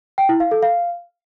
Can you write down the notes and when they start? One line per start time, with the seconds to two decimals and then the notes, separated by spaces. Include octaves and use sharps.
0.18 G5
0.29 E4
0.40 F5
0.51 A4
0.63 F5